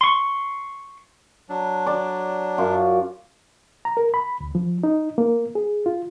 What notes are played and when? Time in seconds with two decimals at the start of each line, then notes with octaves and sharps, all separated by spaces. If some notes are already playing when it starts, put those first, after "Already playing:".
0.01 C6 C#6
1.49 F#3 D4
1.86 D5 A5
2.58 F#2 F4
3.85 A#5
3.97 A#4
4.14 B5
4.40 D2
4.55 F3
4.83 D#4
5.18 A#3
5.55 G#4
5.86 F4